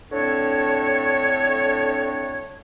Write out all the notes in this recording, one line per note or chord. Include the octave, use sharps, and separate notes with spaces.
A2 D3 C4 D4 C#5